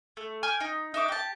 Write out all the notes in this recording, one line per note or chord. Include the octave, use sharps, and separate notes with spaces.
A3
G5 G#5 F6
D#4
D#4 E5 D6
G4 A5